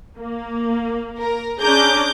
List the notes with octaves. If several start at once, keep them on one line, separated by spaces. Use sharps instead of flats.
A#3
A#4
C#4 D4 G#4 A#5 D6 G6